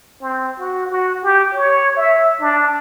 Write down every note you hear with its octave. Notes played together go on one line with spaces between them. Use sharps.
C4
F#4
F#4
G4
C#5
E5
D4